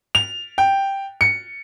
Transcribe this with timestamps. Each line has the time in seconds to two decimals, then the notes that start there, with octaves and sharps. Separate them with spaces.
0.15 F7
0.58 G5
1.21 C#7